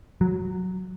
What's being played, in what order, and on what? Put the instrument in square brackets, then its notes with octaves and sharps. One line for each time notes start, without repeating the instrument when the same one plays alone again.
[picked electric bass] F#3